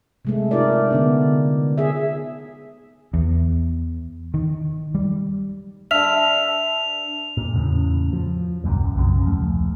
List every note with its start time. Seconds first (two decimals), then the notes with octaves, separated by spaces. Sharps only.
0.25 C3 G#3 A3
0.51 D#4 F4 A#4 D5
0.90 D3 B3 D4
1.78 G#4 E5
3.14 E2
4.34 D#3
4.95 G3
5.91 D4 A4 E5 F6 F7
7.37 A#2
7.54 E2 A2 C#3
8.13 F3
8.64 D#1 C2 F#2 A#2
8.95 B1 F#2 C#3
9.25 D#1 F3 A3